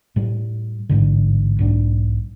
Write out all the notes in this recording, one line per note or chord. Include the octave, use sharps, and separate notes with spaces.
A2 G3
A1 G#2 D3
B1 G#2 D4